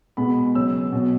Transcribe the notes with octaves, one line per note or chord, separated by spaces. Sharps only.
B2 G#3 B3 B5
C#3 F#3 B3 E6
B2 F#3 B3